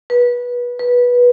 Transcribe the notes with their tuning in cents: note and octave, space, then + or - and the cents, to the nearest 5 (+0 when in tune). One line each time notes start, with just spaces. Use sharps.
B4 -20
B4 -15